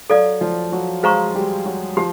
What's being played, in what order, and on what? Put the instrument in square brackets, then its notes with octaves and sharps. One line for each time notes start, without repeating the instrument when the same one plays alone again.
[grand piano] F#3 F#4 [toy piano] A4 D5 F5
[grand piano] F3 F4
F#3 F#4
[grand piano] G#3 G#4 [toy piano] C5 F5 A#5 C#6
[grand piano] G3 G4
F#3 F#4
[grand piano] F3 F4 [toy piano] G4